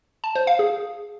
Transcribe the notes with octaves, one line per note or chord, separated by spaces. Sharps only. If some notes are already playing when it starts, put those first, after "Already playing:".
A5
C5
F5
G#4